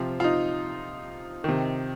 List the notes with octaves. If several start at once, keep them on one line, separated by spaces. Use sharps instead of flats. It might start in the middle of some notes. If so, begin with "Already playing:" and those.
Already playing: C3 F3 F4
F4
D#4
C3 D#3